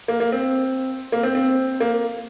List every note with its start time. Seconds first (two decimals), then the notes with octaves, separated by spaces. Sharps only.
0.08 A#3
0.20 A#3
0.32 C4
1.12 A#3
1.23 C4
1.35 C4
1.80 A#3